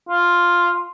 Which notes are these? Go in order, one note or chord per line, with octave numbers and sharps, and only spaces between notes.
F4